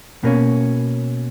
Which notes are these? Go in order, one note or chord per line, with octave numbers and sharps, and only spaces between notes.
B2 A#3 C#4